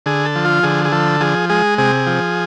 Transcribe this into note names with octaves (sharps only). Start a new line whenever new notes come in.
D3 G#4
A4
F3
F4
D3 G#4
G#4
F3 A4
F3 G#4
G#3 G#4
C3 G#4
F3